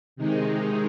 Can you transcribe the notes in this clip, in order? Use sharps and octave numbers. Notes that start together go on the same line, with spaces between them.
C3 D#3 G#3 D#4